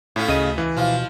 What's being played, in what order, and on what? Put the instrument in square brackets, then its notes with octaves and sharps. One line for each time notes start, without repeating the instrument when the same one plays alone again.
[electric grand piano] A2 [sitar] A3 C#4 F4
[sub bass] D2 [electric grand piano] C#3 D#5 D#7
[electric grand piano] E3
[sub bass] B2 [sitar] F3 F4